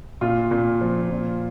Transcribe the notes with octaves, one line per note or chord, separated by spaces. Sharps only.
A#2 F4
A#2
F3
A#2